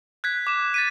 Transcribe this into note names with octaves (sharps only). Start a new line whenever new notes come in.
F#6 G#6 B6
D6 E7
A6 B6 D#7